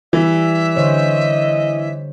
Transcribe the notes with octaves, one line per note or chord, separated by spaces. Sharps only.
E3 G3 E5
D3 C5 C#5 D#5